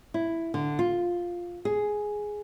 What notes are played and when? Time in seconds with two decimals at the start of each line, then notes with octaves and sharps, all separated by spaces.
0.14 E4
0.54 D3
0.79 F4
1.65 G#4